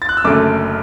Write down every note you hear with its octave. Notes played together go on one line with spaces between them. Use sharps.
A6
F#6
E6
F#1 F#2 D3 A3 D6